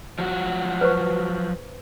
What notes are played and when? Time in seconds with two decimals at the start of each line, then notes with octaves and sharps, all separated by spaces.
0.19 F3 F#3 F#4
0.81 B4 C5 C#6